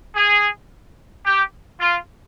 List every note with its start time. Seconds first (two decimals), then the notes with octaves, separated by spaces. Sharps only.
0.15 G#4
1.26 G4
1.80 F4